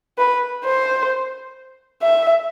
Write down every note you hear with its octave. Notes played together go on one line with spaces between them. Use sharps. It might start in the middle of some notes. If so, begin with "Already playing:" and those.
B4
C5
E5